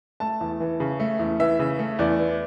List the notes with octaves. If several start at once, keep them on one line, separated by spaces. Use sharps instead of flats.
A3 A5
E2
E3
C#3
A3
E2
E3 E5
C#3
A3
E2 D5
E3